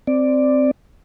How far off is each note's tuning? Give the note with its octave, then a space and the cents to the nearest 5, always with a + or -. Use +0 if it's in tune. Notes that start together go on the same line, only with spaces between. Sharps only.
C4 +0 D5 +5